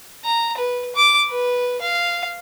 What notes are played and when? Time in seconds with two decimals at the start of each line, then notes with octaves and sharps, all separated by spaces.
0.24 A#5
0.57 B4
0.96 D6
1.30 B4
1.82 F5